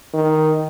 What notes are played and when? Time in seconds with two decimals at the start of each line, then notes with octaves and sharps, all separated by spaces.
0.14 D#3